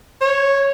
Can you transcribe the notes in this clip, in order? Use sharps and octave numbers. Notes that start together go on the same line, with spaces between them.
C#5